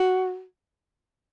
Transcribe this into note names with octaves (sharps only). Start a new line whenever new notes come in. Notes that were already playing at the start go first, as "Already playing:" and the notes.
Already playing: F#4